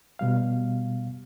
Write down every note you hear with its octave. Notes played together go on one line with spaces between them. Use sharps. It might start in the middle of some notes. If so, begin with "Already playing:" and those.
B2 G3 F5